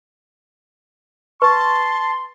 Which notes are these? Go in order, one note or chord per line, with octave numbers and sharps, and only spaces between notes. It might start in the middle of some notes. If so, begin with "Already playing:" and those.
B4 A5 C6 C#6